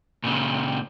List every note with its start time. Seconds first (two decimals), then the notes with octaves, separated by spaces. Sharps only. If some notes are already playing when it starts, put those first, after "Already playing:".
0.24 A#2 C#3